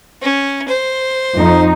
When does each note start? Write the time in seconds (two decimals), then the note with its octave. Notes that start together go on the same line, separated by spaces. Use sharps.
0.22 C#4
0.68 C5
1.34 F2 D#4